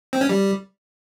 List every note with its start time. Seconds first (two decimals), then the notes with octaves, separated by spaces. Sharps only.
0.13 C4
0.21 C#4
0.29 G3